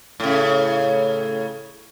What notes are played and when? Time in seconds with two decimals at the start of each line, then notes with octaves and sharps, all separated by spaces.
0.20 A2 C#3